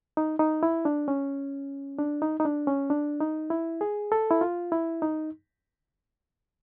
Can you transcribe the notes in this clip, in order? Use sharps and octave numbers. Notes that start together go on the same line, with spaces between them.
D#4
D#4
E4
D4
C#4
D4
D#4
D#4
D4
C#4
D4
D#4
E4
G#4
A4
E4
F4
E4
D#4